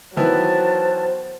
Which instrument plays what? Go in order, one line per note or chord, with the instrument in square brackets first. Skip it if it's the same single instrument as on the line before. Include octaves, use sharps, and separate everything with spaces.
[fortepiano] D#3 E3 B3 [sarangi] F#3 [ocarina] C5 [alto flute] A5